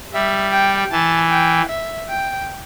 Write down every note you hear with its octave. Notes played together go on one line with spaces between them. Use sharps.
G3 E5
G5
E3 A5
G5
E5
G5